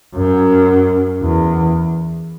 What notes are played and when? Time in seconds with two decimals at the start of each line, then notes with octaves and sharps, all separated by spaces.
0.16 F#2
1.22 E2